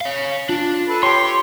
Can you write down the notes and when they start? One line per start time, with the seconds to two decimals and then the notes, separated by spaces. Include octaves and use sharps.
0.01 C#5 F5
0.49 D4 F4
0.88 A4 B4
1.03 G4 C#5 C6